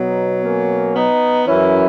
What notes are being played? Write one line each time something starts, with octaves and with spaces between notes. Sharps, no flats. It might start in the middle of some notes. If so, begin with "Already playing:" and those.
Already playing: B2 F#3 B3 D#4
A#3 C#4
B3 D#4
F#2 E3 C#4 E4